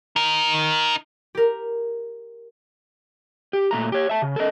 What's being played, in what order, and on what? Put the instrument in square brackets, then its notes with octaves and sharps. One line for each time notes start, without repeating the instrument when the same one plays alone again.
[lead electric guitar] D#4 A#4
[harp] G4 A#4
[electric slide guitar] G4
A#2 A3 A#5
G4 C#5
E5 A5
C#3
A4 A#4 D#5